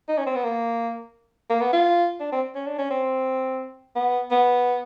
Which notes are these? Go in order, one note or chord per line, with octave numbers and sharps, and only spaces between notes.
D#4
C#4
C4
B3
A#3
A#3
B3
F4
D4
C4
C#4
D4
C#4
C4
B3
B3